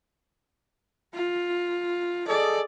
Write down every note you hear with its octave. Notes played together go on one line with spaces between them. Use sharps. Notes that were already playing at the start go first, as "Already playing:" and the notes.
F4
G#4 A4 D5 D#5